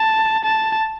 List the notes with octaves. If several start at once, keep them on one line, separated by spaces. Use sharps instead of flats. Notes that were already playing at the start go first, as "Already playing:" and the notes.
Already playing: A5
A5